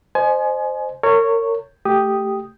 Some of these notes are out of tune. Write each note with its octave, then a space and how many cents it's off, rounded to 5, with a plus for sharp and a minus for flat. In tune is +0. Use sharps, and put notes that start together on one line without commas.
C5 +0 D#5 -30 G#5 +30
A#4 -35 C#5 +0
A3 +0 G4 +0 D#6 +0